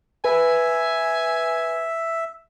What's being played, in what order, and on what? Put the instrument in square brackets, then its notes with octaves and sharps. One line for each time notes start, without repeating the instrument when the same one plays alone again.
[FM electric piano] B4 [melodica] E5 [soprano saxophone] G#5